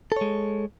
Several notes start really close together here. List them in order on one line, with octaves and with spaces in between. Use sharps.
A4 C#5 G#3